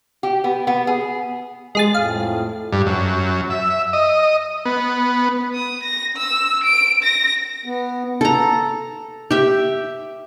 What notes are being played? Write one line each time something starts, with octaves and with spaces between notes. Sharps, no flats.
G4
B3
B3
G#4
G#3 G#4 A6
F2 A2 F5
G2
F#2
E5
D#5
B3
D#6
A#6
E6
D7
A#6
B3
A4 A#5
G4 E5